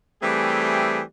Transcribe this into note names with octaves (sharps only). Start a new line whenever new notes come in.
E3 G3 A3 C4 G4 G#4